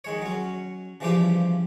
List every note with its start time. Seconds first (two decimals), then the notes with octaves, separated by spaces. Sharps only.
0.04 D#3 G#3 C#5
0.22 F#3 C#4
1.00 C#3 E3 F3 G3 G4 C5